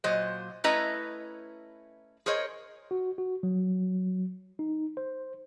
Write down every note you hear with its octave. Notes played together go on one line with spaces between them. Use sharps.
A#2 F#3 C5 D#5
A3 C#4 E4 B4 D#5 A#5
G#4 A#4 C5 C#5 D#5
F#4
F#4
F#3
D#4
C5